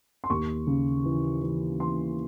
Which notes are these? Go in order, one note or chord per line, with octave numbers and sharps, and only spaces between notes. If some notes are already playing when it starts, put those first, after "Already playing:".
C6
D#2 C#6
C#3
E3
E3
E3 C6